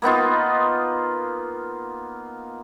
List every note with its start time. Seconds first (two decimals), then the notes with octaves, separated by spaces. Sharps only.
0.02 A#3 B3 D#4 F4